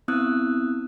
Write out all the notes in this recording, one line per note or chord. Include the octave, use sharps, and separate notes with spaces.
B3 C4 E4 D#6 E6 F#6